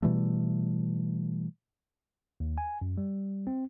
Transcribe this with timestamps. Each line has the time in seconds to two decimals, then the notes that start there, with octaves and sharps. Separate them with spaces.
0.02 B2 E3 G3 A3
2.40 D#2
2.58 G#5
2.82 F#2
2.98 G3
3.47 C4